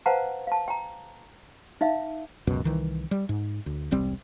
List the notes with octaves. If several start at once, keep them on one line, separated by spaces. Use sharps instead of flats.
B4 C5 F5 F#5 A5 A#5
F5 A5
G5 A#5
D#4 E5 F5
E1 C#2 F#2 B2
C2 D#3 E3
G3
G#2
D2
E1 C2 G3 C4